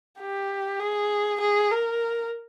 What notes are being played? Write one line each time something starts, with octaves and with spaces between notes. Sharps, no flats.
G4
G#4
G#4
A#4